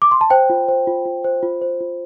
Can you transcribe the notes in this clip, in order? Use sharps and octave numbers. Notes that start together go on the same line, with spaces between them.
D6
C6
A5
C5 G5
F4
C5
F4
F4
C5
F4
C5
F4